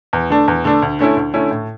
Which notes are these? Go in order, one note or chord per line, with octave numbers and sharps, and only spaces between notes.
E2
D3 A3 D4
E2
D3 A3 D4
D2
D3 A3 C#4 E4
D2
D3 A3 C#4 E4
A2